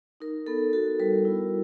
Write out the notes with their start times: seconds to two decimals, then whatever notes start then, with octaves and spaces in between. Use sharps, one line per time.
0.20 D#4 A#4
0.46 B3 A4
0.73 F#4 A4
1.00 G3 A#4
1.25 E4